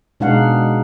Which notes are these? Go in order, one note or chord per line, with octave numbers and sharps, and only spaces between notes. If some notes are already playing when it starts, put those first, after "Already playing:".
B2 G#3 D4 D#4 F5 F#5